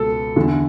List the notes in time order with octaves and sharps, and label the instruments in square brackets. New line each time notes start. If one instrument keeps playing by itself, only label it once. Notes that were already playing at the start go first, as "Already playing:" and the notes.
Already playing: [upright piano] C#2 B2 A4
E2 D3